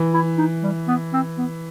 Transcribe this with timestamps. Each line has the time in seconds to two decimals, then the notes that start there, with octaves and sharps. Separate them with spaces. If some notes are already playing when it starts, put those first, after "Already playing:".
Already playing: E3
0.14 E4
0.38 D#4
0.63 G3
0.88 B3
1.13 C4
1.38 B3